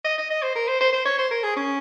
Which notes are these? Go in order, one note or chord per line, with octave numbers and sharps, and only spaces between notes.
D#5
D#5
D#5
C5
A#4
C5
C5
C5
C#5
C5
A#4
G#4
C#4